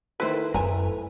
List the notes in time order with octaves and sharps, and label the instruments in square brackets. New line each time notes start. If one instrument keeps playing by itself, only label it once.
[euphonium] D#3 [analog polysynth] A3 E4 [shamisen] B4 C5
[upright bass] F#2 [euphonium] B4 [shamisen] G#5 A#5